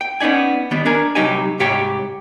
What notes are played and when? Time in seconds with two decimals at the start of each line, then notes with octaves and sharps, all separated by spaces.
0.01 G5
0.20 B3 C#4 D#4 D5 G#5
0.71 D#3 G3 B3 D4
0.86 D4 A#4 G#5
1.15 C2 C#3 F#3 D#4 G4 G#5
1.59 C2 G#2 G4 C#5 G5